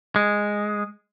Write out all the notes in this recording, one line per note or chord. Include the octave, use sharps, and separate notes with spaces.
G#3